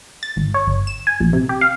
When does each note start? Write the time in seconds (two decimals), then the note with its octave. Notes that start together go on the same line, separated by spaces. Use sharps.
0.23 A6
0.36 G#1
0.54 C#5
0.67 G1
0.87 E7
1.07 G#5
1.20 A#1
1.33 C3
1.49 G4
1.61 F5